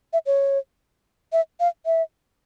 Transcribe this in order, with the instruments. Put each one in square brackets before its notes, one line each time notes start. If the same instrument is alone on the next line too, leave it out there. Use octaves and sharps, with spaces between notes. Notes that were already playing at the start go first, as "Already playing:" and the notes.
[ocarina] E5
C#5
E5
F5
E5